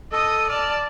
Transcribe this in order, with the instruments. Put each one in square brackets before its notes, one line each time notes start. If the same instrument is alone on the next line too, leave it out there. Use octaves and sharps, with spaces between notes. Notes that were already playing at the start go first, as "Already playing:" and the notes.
[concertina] A4 [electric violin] D#5 D#6
[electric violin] D5 A5 [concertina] F6